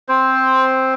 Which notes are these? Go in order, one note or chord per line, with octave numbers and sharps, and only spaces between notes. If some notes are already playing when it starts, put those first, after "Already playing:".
C4 C5